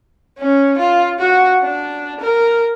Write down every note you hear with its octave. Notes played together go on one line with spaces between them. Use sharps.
C#4
F4
F#4
D4
A#4